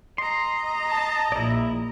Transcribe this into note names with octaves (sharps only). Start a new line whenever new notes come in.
D#5 A#5 C6
A5
A#1 E4 D5